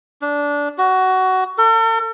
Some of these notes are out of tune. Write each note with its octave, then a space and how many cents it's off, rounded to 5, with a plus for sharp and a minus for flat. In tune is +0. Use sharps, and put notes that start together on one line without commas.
D4 -15
F#4 +15
A4 +45